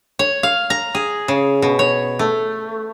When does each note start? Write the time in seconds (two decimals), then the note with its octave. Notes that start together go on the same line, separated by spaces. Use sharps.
0.19 C#5
0.43 F5
0.70 A#5
0.95 G#4
1.28 C#3
1.62 B2
1.79 C#5
2.19 A3